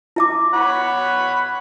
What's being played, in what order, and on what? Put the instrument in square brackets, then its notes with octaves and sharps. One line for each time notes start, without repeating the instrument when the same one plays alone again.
[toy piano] E4 E5 D6
[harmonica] C#5 F#5 B5